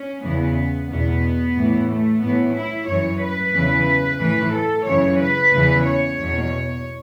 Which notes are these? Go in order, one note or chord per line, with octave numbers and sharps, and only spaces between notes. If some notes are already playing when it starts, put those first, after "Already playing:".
Already playing: C#4
E2 C#3 E3 B3
E2 B2 B3
A2 E3
A3
A2 E3 B3
E4
F#2 E3 C#5
B4
E2 C#3 E3
A2 E3 B4
A4
F#2 C#3 E3 C#5
B4
E2 C#3 E3
C#5
E2 B2